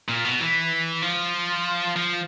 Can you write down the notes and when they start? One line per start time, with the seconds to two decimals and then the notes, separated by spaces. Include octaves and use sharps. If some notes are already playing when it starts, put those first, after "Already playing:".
0.09 A#2
0.24 B2
0.40 E3
1.02 F3
1.96 F3